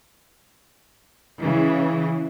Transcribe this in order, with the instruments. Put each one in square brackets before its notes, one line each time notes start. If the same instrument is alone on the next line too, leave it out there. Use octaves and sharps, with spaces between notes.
[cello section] C#3 E3